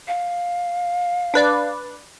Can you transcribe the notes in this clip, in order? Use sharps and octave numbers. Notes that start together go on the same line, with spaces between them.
F5
D4 B4 D5